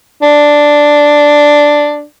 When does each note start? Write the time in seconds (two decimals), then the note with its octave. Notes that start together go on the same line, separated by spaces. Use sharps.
0.22 D4